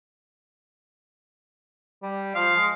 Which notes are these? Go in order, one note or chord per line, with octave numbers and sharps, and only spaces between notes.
G3
F3 F5
G#3